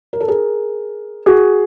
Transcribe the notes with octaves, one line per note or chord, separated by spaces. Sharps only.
A#4
A4
G#4 A#4
F#4 G#4